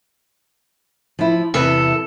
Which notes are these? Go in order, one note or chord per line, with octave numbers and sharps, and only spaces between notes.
F3 E4
E2 C3 A4 B4